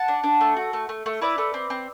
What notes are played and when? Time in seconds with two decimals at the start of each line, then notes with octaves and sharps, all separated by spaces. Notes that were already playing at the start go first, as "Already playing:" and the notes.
Already playing: F#5 A5
0.08 D4
0.24 D4
0.41 A3
0.57 F#4
0.73 A3
0.89 A3
1.06 A3
1.21 E4 B4 D5
1.38 A3
1.54 C4
1.70 C4